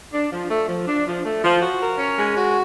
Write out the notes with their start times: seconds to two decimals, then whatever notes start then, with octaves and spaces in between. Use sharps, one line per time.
0.13 D4
0.32 F3
0.50 A3
0.68 F3
0.87 D4
1.07 F3
1.25 A3
1.44 F3
1.62 F#4
1.81 A#4
1.99 C#4
2.19 G#3
2.36 F#4